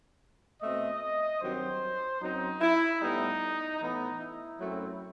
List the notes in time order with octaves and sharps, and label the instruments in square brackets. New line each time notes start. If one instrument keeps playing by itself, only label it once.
[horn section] B2 A3 C4 D#5
G2 D#3 F#3 C4 C5
F#2 F#3 C4 D#4
E4
A2 G3 B3 D#4
A2 E3 B3 D#4
E4
F#2 F#3 A3 C4